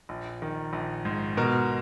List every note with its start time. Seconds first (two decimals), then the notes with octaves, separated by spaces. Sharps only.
0.09 A#1
0.42 D#3
0.73 A#1
1.05 G#2
1.37 B2 A#4